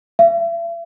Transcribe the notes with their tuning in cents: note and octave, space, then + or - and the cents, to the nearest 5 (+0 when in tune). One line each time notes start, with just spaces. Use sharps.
E5 +40